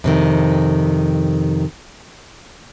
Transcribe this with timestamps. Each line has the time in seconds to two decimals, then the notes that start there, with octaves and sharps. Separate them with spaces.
0.04 F2 C3 D#3